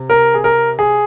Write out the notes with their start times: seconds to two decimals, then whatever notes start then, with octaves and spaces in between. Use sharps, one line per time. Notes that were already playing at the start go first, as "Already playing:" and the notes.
Already playing: C3
0.10 A#4
0.34 G#4
0.44 A#4
0.79 G#4